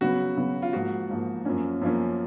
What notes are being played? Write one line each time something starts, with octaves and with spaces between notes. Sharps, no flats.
C#3 F#3 B3 F#4
C#3 F#3 B3
F4
G#2 F3 A#3 F#4
G#2 F3 A#3
F#2 F3 A#3 C#4
F#2 F3 A#3 C#4